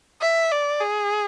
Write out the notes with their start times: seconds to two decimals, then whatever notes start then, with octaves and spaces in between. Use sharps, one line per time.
0.21 E5
0.51 D5
0.80 G#4